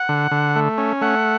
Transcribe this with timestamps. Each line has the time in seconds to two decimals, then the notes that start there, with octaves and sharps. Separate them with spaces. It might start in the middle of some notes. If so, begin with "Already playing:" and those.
Already playing: F#5
0.09 D3
0.31 D3
0.56 A3
0.78 C#4
1.01 A3 F#5